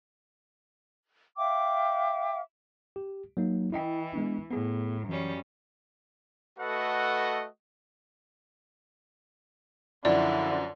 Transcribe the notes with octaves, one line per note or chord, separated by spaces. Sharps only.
E5 F5 G5 D6
G4
F#3 A#3 D#4
E3 E4 D#5 G5
G#3 B3 D4
A2 B3 G#4
F#2 E3 G3 C#4
A3 F#4 A4 B4 D#5 F#5
F#2 D3 F3 E4 D5